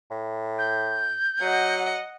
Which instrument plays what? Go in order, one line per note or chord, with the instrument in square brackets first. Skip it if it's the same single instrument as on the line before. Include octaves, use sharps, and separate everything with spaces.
[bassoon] A2
[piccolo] G6
[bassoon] F#3 [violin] D#5 F#5